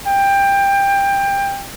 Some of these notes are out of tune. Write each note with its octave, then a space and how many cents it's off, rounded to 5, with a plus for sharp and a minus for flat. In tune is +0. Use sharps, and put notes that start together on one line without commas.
G5 +20